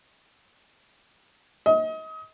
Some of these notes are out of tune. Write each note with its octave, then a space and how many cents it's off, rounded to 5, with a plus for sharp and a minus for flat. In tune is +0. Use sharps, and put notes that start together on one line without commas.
D#5 +35